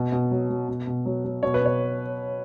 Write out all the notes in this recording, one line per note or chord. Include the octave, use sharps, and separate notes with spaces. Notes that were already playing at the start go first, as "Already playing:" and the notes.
Already playing: B2
B2
F#3
F#3
B2
B2
F#3
F#3
B2 C#5
B4
B2 C#5